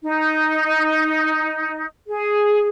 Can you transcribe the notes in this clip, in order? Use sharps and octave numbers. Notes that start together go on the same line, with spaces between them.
D#4
G#4